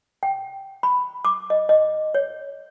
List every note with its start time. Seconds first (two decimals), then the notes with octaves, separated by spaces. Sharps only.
0.23 G5
0.83 B5
1.25 D6
1.50 D#5
1.69 D#5
2.15 C#5